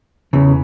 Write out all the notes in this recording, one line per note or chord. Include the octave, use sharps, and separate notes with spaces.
E2 C#3 E3